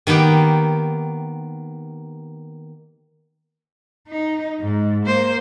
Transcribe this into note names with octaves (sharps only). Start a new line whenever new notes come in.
D#3 A#3 B3 G4
D#4
G#2
A#3 C5